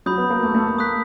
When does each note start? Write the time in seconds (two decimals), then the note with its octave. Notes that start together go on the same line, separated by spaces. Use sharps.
0.06 F#3 B5 D#6 G6
0.18 B3
0.30 A#3
0.43 A3
0.54 A3
0.67 A#3
0.79 A#3 D#6 F#6 B6